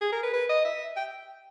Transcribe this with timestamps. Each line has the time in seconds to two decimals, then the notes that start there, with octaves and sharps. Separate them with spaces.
0.01 G#4
0.12 A#4
0.23 B4
0.33 B4
0.49 D#5
0.65 E5
0.97 G5